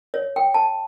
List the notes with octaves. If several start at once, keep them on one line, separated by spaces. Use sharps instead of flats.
C#5
G5
A5